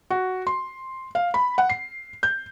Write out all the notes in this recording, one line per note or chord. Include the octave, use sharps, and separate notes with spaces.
F#4
C6
F5
B5
F#5
C7
G6